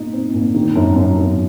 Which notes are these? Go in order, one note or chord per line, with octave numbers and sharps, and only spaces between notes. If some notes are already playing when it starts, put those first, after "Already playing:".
Already playing: A#2 D#4
C4
A#2
D#3
F#2
F#2
F#2